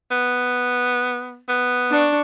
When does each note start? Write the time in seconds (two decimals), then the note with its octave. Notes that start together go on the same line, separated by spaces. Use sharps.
0.11 B3
1.48 B3
1.91 D4 C#6